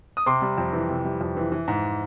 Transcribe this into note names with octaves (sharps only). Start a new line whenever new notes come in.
D#6
C3 C6 D6
G3
F2
E3
C3
G3
F2
E3
E3
G#2